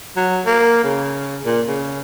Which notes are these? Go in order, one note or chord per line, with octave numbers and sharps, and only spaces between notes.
F#3
A#3
C#3
A#2
C#3